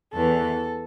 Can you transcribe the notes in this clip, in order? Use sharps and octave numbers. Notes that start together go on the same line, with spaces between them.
E2 E3 A4